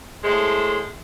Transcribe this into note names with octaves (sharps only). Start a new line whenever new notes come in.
A2 G#3 A3 C5